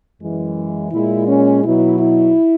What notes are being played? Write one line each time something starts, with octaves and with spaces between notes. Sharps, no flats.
F#2 E3 G#3
A#2 G#3 E4
C#4
B2 F#3 E4
E4